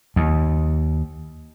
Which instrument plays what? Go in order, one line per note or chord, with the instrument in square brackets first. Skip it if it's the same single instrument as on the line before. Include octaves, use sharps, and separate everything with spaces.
[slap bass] D#2